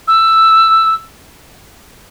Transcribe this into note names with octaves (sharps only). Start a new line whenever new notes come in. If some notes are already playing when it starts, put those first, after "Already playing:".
E6